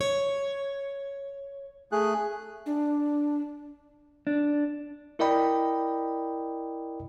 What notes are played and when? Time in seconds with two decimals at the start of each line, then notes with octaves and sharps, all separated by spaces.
0.01 C#5
1.92 A3 G#4 F#6
2.66 D4
4.27 D4
5.19 E4 A#4 D5 D#5 G5 B5